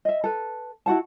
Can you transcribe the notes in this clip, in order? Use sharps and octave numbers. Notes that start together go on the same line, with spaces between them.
D#5 E5
A4 B4
E4 F#4 F#5 A5